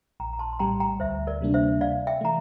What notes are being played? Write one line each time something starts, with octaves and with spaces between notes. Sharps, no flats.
A#1 G5 A#5
A#5
A5 C6
C6
A2 G3 G5 A#5
G5 A#5
D2 C5 E5
A#4 D5
C3 G3 A#3 D4
C5 E5
C3 D5 F5
E5 G5
E3 A3 A#5